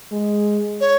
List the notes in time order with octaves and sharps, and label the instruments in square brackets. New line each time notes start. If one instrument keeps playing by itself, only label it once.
[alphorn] G#3
[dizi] C#5